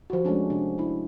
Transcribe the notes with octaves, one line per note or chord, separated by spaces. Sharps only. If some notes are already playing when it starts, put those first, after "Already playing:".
F3 F#4
G#3 A3 C#4 D4
C3 D4
D4 E4